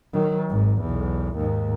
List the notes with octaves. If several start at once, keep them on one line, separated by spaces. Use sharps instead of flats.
D#3 F#3
G#1 G#2
B1 E2
D#2 G#2